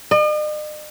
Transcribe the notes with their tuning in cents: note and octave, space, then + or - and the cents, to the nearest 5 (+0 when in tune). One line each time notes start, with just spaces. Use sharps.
D#5 -45